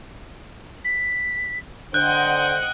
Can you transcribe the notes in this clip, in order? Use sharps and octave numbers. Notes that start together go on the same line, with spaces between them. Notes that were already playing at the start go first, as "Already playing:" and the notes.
B6
D3 C5 D#5 F#5 G5 F#6 G6